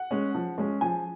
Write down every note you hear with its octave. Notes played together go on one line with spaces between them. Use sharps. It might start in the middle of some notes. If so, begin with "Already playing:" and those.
Already playing: F#5
G#3 C#4
F3
G#3 C#4
F3 G#5